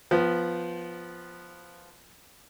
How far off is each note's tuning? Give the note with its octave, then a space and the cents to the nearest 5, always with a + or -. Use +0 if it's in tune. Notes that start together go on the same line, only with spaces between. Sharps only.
F3 +0 B3 +0 G5 -45